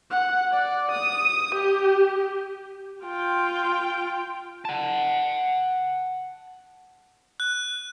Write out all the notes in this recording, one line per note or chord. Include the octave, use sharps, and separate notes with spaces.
F#5
D5
D#6
G4
F4 G5
F#5 A5
F#6